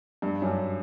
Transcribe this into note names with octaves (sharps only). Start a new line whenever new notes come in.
G2
F#2
G2